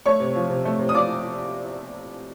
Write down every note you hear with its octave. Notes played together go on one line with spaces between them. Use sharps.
A3 C#5 C#6
C3
F3
C3
A3
C3
D#6
F3 D5 D6